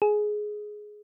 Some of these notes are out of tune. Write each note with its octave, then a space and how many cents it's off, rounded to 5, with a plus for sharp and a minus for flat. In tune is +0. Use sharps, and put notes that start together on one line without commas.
G#4 +15